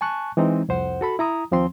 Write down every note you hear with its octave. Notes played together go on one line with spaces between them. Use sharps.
G#5 A5 C#6 F#6
E3 G#3 C4 D#4
C2 F2 C5 F#5
F#4 A4 B5
E4 A#5 D#6
D#2 F3 C4 C6